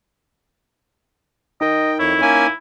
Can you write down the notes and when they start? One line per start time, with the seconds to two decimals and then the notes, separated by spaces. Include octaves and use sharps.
1.61 D#4 A#4 D#5 G5
1.99 F2 E4 C#5
2.22 A#3 C#4 G#5